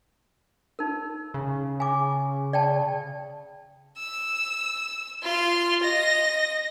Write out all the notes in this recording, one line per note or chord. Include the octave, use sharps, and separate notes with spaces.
D#4 A#4
C#3
G#5 D6
D5 G5 A5
E6
F4 C6
D#5 A#6